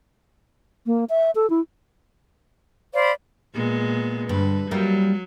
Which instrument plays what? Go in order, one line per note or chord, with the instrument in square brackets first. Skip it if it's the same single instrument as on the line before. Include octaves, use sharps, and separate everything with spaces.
[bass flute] A#3
E5
A4
E4
[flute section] C5 F5 B5 [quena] D5
[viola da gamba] A#2 G#3 B3
[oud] G2 [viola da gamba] D3 B4
[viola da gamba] F#3 [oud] G3 A#3 E4